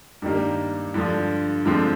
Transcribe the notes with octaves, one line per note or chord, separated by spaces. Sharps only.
G2 D#3 G3 A#3
G2 D3 F3
G2 D3 F3 G#3 C4